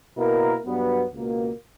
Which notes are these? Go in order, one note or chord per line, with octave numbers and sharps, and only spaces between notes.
B2 A#3 E4 A#4
G2 F#3 B3
C#2 B2 A#3